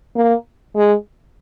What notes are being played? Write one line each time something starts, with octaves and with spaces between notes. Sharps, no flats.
A#3
G#3